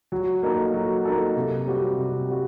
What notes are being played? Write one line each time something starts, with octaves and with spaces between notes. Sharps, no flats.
F#3
A#3 D#4 A4
F#3
A#3 D#4 A4
C3
G3 C4 F#4
C3
G3 C4 F#4